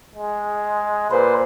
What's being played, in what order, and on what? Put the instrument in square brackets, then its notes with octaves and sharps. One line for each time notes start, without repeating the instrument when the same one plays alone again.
[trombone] G#3
[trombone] A#2 [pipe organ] B4 C5